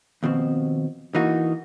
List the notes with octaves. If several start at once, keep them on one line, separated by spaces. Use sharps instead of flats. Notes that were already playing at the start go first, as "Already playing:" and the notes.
D#2 B2 F3 C4
E3 A#3 D#4 F4 F#4